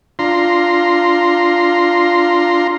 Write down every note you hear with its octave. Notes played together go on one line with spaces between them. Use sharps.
D4 F4 A#5 C6